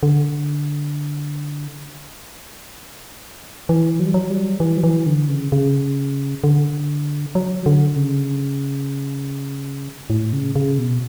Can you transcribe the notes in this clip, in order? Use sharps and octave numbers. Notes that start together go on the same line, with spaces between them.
D3
E3
F#3
G3
F#3
G3
E3
F#3
E3
D3
C#3
C#3
D3
F#3
D3
C#3
A2
C#3
C#3
B2